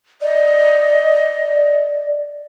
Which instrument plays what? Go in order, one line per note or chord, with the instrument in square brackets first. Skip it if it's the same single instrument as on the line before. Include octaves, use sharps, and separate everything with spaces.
[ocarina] D5 [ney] D#5